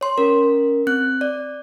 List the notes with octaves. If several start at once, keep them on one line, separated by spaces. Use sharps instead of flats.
C#5 C6
C#4 A#4
C4 F#6
D5